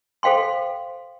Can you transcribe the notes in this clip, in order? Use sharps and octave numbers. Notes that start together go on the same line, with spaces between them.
A4 C5 F5 G5 C6